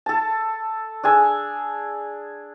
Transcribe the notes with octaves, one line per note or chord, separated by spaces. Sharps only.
A4 A5
D4 G#4 G#5 E6